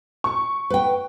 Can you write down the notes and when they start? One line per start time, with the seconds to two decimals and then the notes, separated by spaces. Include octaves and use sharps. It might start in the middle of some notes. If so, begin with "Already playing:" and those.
0.24 C#6
0.70 B4 G5